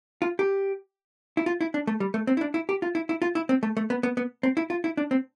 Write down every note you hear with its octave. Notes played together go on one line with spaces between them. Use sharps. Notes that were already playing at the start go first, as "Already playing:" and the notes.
F4
G4
E4
F4
E4
D4
A3
G3
A3
C4
E4
D4
E4
G4
F4
E4
E4
F4
E4
C4
A3
A3
B3
B3
B3
C4
E4
F4
E4
D4
C4